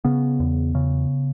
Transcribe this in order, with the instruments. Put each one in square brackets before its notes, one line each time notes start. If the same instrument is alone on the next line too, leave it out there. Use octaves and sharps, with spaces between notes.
[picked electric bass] C#3 B3
E2
C#3